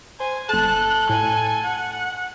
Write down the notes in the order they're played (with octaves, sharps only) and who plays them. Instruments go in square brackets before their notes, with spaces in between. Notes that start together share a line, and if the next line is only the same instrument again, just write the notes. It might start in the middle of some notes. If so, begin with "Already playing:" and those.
[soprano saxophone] C5 [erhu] G#5
[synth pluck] G1 A5 [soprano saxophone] A4 [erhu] F#6
[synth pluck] A2 [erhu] G#5
[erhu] F#5